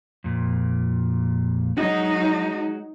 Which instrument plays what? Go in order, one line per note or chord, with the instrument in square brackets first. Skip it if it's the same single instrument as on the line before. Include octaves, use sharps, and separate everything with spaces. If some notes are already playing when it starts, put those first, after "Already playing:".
[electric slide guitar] F2 A#2
[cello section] F#3 D#4 [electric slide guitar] G#3 F#4